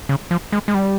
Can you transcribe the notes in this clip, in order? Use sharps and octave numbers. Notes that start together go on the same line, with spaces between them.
C#3
F3
G#3
G#3
G3